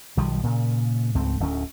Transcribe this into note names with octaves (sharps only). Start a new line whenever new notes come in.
B1 D#3 F3 G3
A#2 C#3
C#2 G#2 A3 C4
D1 D2 C#4